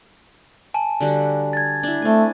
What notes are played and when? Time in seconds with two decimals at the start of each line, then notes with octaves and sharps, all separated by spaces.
0.74 G#5 A5
1.01 D3 G3 F#4
1.53 G#6 A6
1.83 D4 E4
2.02 A3 C4 G#5